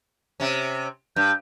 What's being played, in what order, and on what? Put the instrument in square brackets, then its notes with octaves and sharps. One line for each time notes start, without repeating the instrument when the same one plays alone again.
[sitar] C3 C#4
[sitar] G2 [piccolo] G6